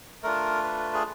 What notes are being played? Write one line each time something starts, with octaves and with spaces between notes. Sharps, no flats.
A3 D4 F4 A#4
B4
G#4